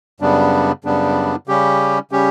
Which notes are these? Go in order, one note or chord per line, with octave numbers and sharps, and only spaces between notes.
F#2 C#3 G3 B3 D4
F#2 C#3 G3 B3 D4
C#3 G3 C#4 G4
C#3 G3 C#4 G4